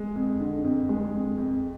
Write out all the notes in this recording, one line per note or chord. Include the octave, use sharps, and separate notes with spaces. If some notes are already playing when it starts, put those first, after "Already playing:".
Already playing: G#3
F2
D3
F2
G#3
F2
F2